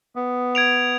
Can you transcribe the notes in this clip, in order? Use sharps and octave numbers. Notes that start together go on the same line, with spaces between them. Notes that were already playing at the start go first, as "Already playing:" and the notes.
B3
G#6 D7 F7